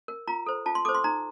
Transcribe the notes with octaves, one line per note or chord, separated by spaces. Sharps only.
A#4
F4 A#5
A4 C5
F4 A5
C6
A4 C5 D6
C6
D#4 A#5